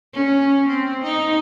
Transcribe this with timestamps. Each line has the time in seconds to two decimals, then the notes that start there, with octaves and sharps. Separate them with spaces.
0.14 C#4
0.69 C4
1.04 D#4